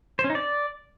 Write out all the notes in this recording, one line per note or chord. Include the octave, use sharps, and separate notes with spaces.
C5
C#4
D#4
D5